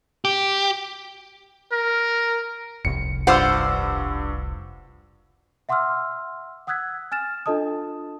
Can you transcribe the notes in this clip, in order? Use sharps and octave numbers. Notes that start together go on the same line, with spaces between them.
G4
A#4
F1 C2 C#7
G2 F4 C5 F#5 D6 E6
E5 F#5 C6 D6 E6 F6
F#5 D#6 E6 F#6 G#6 B6
G#5 F6 A6 E7
D4 F4 A4 D#5 A5 D#6